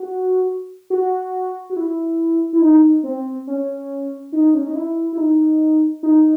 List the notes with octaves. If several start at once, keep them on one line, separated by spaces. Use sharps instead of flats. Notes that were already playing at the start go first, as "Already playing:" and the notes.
Already playing: F#4
F#4
F#4
E4
E4
D#4
C4
C#4
D#4
C#4
D#4
E4
E4
D#4
D#4